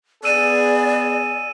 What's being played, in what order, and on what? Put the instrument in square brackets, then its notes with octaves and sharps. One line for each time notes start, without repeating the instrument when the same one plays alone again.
[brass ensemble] B3 G#4 [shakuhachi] D5 [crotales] E6 D#7 E7